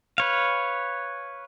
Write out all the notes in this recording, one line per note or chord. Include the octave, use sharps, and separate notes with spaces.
B4 C#5 F5